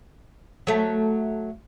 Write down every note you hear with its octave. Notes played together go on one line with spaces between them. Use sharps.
F#3 A3